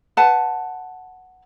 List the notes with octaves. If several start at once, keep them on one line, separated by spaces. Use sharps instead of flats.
B4 F#5 A5